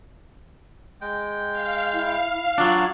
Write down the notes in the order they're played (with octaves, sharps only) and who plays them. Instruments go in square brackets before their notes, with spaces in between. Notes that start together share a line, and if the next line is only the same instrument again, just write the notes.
[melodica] G#3 G5
[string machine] F5
[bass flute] E4
[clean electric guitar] F#3 D4 [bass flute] F4